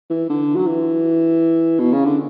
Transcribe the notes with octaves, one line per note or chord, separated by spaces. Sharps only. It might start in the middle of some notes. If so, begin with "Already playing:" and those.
E3
D3
F#3
E3
B2
C#3
D3